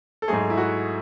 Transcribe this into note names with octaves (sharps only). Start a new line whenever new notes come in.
A4
G#2 F#3 A3 G#4
E4
F#4